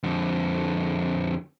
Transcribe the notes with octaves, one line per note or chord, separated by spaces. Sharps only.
F2 D3